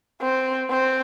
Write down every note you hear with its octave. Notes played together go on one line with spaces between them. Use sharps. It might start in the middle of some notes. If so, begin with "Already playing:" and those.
C4
C4